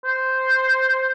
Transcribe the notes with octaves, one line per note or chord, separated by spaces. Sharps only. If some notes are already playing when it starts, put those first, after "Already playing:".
C5